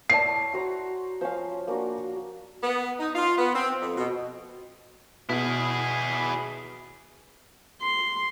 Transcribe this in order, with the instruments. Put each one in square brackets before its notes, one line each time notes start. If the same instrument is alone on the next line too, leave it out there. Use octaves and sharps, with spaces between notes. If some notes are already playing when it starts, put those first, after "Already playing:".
[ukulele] E4 D5 A5 [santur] C#5 [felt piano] C7
[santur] F#4 C5 A#5
[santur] F3 C#4 [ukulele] C5 F5
[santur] A#3 D4 F#4
[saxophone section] B3
D#4
F4
B3
C4
F2
B2
[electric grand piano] B2 [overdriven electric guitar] E4 G#4
[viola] C6